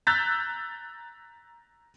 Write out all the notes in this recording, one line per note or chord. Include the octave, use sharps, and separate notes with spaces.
A#5 E6 F#6 G6 A6 B6